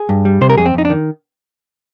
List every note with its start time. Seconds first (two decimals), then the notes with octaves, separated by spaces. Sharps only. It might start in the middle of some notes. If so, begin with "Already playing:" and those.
Already playing: G#4
0.09 G2
0.25 G3
0.41 C3 C5
0.50 A#4
0.58 F2 G#4
0.65 C4
0.74 F2 D#4
0.85 D4
0.90 D#3